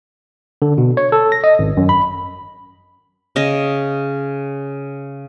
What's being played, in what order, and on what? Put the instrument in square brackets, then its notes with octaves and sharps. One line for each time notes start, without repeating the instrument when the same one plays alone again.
[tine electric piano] D3
B2
C#5
A4
A#6
D#5
G#1
F#2
B5
[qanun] C#3 D#5